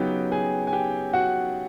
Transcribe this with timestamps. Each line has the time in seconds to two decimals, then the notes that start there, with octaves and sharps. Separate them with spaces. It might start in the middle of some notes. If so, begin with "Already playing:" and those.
Already playing: C#3 F#3 B3 D#4 G4 G5
0.32 G#4 G#5
0.67 G#5
0.73 G4 G5
1.13 F#4 F#5